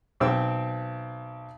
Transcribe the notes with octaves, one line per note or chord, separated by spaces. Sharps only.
B1 C4 E6